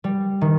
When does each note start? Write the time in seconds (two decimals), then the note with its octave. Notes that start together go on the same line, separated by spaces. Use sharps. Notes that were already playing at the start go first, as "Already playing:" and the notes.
0.04 G3
0.41 D#3